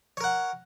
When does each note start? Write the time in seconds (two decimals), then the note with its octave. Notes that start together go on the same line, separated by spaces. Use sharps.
0.17 C#5
0.21 A#4
0.24 F#5